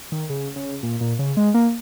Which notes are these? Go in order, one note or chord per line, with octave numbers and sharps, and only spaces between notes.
D#3
C#3
C#3
A#2
A#2
C#3
G#3
A#3